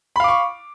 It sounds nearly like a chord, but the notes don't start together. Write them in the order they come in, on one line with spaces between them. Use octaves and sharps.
B5 F5 D6 C#6